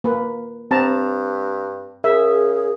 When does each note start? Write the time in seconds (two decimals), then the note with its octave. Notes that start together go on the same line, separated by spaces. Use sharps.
0.04 A#3 B4
0.71 G2 C4 A5 A#5
2.04 C#3 G#4 A#4 E5